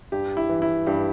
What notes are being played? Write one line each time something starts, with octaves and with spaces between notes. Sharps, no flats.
G2 G4
E4
E3
E4
G2 G4